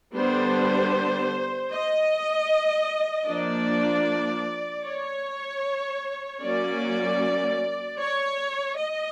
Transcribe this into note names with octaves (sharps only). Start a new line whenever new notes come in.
D3 G3 B3 D4 C5
D#5
F3 A#3 D4 D5
C#5
F#3 A#3 C#4 D5
C#5
D#5